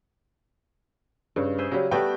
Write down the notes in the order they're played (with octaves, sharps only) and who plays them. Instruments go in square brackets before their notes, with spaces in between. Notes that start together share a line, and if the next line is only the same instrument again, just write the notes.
[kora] G2 [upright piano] C#3
[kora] G#4 C5 E5
[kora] C#3 [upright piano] F#3 G3
[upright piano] G3 G5 [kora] A3 B3 F#4